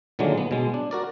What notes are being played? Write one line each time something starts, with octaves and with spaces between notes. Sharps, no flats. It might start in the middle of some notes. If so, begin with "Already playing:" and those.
A#2 D3 D#3 F#3 G#3 A#3
B3
B2 G#3
D4
F#4 A#4 D5